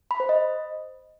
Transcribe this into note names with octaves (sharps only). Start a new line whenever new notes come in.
B5
C5
D#5